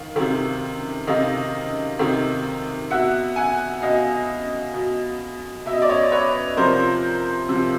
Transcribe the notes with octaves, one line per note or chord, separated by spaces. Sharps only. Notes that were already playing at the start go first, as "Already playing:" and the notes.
Already playing: D#3 F5
C3 D#3
C3 D#3 D#5 F5
C3 D#3
B2 E5 F#5
F#5 G#5
B2 D#5 F5
B2
B2 E5
D#5
D5
C#5 D#5
B4 C#5
C3 F3 A#4 C5
C3 F3